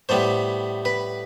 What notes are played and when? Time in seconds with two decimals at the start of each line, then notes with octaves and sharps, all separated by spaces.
0.09 A2 G3 B3 C5
0.85 B4